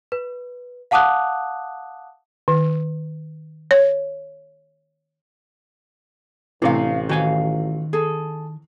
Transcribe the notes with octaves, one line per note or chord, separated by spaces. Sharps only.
B4
F5 F#5 A5 D6 D#6 F#6
D#3
C#5
A1 A2 C3 E3 D4 F5
D#3 F#4 F5 G#5
G#4 A4